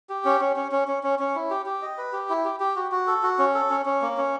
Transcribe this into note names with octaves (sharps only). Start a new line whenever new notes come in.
G4
C#4
C#4
C#4
C#4
C#4
C#4
C#4
E4
G4
G4
D#5
B4
G4
E4
G4
G4
F#4
F#4
A4
F#4
C#4
A4
C#4
C#4
A#3
C#4